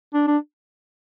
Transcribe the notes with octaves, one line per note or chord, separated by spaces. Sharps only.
D4
D4